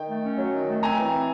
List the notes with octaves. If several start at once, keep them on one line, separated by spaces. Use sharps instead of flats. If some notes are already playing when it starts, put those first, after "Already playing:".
Already playing: D#3 G5
A3
C#4
F#3
D#3
A3
C4 G#5 A#5
E3